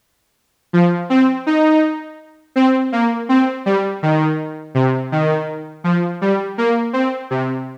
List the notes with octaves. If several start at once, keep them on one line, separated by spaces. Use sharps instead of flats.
F3
C4
D#4
C4
A#3
C4
G3
D#3
C3
D#3
F3
G3
A#3
C4
C3